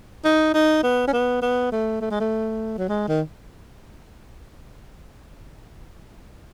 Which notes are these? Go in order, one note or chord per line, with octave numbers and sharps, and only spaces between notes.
D#4
D#4
B3
C#4
B3
B3
A3
A3
G#3
A3
F#3
G#3
D#3